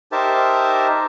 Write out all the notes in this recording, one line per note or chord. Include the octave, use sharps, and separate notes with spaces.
D#4 G4 A#4 C5 E5 A5